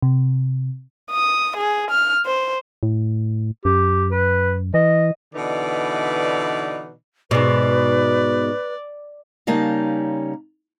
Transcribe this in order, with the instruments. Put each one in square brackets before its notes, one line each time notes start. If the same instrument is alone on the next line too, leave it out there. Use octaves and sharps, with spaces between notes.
[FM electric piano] C3
[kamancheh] D#6
G#4
F6
C5
[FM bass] A2
[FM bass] F#2 [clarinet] G4
[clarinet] B4
[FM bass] E3 [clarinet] D#5
[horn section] B2 D3 E3 D#4 B4 D5
[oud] G#2 B2 [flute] B4 [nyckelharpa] D5
[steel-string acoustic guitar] C#3 G3 A#3 C#4 D#4 A5